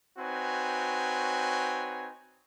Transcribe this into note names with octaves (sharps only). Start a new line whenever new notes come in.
C4 D#4 F#4 B4 C#5 G#5